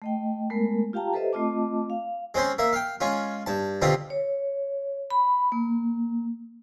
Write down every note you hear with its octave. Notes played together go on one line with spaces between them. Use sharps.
A3 D#5 G5
G#3 A3 B3 A#4
F4 G4 F5 G5 A5 A#5
G4 A4 B4 C5 D#5 E5
A3 C4 F4 D#5 A5 D6
F5
G#3 C4 C#4 C5
A#3 E5
F5 G5
G#3 C#4 F4
G2 A5
B2 D3 C4 F4 G4
C#5
B5
A#3